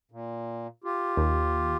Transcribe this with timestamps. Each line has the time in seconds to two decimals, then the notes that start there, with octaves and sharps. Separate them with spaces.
0.11 A#2
0.84 F4 G4
1.17 D#2